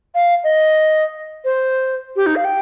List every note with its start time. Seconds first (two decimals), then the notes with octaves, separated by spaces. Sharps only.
0.15 F5
0.44 D#5
1.45 C5
2.16 G4
2.26 D#4
2.36 F5
2.45 G5